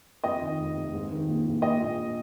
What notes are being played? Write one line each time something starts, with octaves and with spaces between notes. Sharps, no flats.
F2 D#5
D#3
F1
F1
G#2
D#3
A#1
A#1
A#2 D#5
A#1